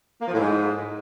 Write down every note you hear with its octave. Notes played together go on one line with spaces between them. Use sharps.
A#3
F3
A2
G#2